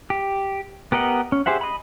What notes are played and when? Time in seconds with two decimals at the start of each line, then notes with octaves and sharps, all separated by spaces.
0.10 G4
0.92 B3 G4 A#4 D#5 F#5
1.32 C#4
1.46 G4 G#4 C5 E5 F#5
1.61 D#5 B5